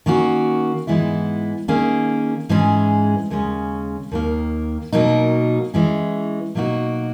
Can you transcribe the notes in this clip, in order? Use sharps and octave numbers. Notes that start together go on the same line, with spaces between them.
D#3 A#3 C#4 F#4
G#2 E3 G#3 B3 E4
D#3 A#3 C#4 G#4
G#2 E3 G#3 C#4 G#4
D#2 C#3 G#3 C#4
D#2 D#3 A#3
B2 F#3 A#3 D#4
E3 G#3 C#4
B2 F#3 A#3 D#4 F#4